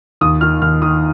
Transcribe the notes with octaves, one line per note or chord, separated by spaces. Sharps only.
D#2 D#6
D#3 F6
D#2 F6
D#3 D#6